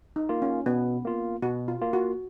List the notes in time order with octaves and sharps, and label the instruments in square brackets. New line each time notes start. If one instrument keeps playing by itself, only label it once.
[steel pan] D#4
[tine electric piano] A#3 F4
[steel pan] C#4
[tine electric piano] B2 [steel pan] B3
[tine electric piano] A#3 F4
[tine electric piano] B2 [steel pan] F#4
[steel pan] F4
[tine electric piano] A#3 F4
[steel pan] F#4